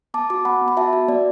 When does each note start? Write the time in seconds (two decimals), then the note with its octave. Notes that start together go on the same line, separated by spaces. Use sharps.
0.14 B3 A5 D6
0.30 F#4 A5 D6
0.45 B3 F#5 B5
0.61 B3
0.68 B5
0.77 F#4 E5 A5
0.93 F#4
1.08 B3 D5